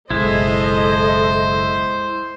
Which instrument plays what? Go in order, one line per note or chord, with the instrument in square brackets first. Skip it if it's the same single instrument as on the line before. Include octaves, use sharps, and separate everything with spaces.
[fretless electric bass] F#1 B1 [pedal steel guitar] G#3 E4 [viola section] A4 D#5 [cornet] C5